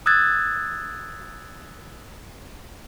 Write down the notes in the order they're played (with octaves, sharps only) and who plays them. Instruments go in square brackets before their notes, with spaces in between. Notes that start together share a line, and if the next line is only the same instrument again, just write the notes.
[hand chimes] D#6 E6 F#6 G#6 A6